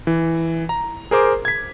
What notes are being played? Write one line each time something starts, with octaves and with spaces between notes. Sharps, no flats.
E3
A#5
G#4 A#4 C5 D6
G#6 B6